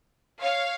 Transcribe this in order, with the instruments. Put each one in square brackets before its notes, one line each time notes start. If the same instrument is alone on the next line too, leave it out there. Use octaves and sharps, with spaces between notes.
[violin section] C#5 F5